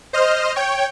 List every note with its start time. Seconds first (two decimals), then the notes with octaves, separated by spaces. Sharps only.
0.13 C5 D#5 F6
0.56 C#5 G5